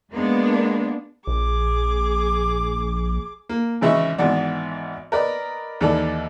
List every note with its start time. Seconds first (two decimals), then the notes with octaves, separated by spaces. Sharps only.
0.12 G#3 A#3 B3 D4
1.27 A#1 G#4 D6
3.49 A#3
3.81 G#1 C#3 E3 D#5 E5 C#6
4.18 G#1 G#2 E3 B3 D5
5.12 A#4 B4 D5 D#5
5.81 D#2 E3 A4 D5